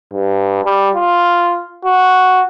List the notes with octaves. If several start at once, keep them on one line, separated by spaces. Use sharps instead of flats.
G2
G3
F4
F#4